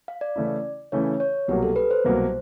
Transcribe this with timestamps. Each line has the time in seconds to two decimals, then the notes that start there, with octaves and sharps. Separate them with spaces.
0.08 F5
0.21 D5
0.36 C#3 E3 A3 C#4 E4
0.92 C#3 E3 A3 C#4 E4 C#5
1.20 C#5
1.48 C2 B2 F#3 A#3 G4
1.63 A4
1.76 B4
1.91 C5
2.05 C2 B2 F#3 A#3